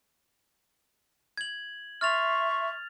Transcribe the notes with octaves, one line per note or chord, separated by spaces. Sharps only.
G#6 F#7
E5 C6 C#6 F6 A6 F7